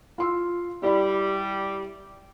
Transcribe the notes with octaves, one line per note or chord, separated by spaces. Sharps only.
F4 C6 E6
G3 E4 D5 B5